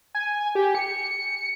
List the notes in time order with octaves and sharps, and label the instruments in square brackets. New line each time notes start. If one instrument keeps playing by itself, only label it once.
[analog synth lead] G#5
G4
C#7